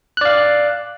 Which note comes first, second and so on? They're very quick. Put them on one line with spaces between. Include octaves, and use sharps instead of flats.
F#6 D5 F5